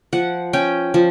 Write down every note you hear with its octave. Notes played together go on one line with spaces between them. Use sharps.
F3 F#5
C#4 G5
F3